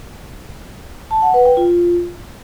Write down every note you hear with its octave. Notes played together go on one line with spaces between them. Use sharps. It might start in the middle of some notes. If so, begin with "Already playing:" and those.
A5
F#5
B4
G5
F4